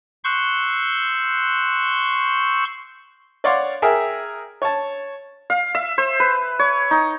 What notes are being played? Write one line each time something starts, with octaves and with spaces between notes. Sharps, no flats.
C6 C#6 E6 F#6 G6
C#5 D5 F5 F#5 C6
G#4 A#4 E5 G5 G#5
C#5 A5
F5
E5
C5
B4
C#5
D#4